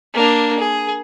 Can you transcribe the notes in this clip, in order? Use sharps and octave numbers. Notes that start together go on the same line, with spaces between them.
A#3 D4
G#4